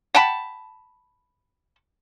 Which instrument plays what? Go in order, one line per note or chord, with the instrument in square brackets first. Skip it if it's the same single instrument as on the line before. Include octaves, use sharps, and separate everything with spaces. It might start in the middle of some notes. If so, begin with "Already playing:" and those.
[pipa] F#5 G5 A5 B5